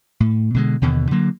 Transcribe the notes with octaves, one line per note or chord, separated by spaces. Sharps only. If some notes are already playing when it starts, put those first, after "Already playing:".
A2
B2 D3 G#3
D#2 B2 D3
D3 F#3 A#3